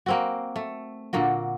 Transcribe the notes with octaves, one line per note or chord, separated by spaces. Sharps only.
A#3 C4 F#4
A3
A#2 D3 A#3 F#4